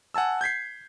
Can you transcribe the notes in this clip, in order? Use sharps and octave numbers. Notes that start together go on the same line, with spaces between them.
F#5 G#5 A5 E6
G6 G#6 B6 C7